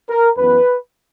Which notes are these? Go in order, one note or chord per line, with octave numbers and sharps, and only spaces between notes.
A#4
F#2 E3 B3 B4